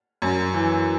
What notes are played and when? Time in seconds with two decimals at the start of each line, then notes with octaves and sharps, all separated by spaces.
0.22 F#2
0.54 E3